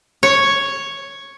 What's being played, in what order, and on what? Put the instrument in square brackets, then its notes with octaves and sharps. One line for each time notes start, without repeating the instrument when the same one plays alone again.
[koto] C#5